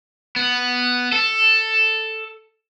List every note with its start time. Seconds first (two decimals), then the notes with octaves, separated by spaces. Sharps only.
0.36 B3
1.12 A4